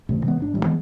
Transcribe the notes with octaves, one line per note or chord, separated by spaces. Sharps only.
A1 D2 G2 C3
C3 E3 G#3 B3
G1 D4
A1 G3
E3 F3 G#3 B3